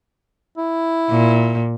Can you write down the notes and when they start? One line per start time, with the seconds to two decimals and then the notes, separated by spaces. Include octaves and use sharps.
0.58 E4
1.10 A#2